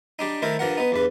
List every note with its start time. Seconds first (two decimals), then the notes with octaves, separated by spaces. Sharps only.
0.19 G3 D4 D#4
0.42 D#3 A3 E4 A#4 C5
0.59 G2 F3 A#4 F#5
0.78 B3 D#4
0.92 E2 G2 B4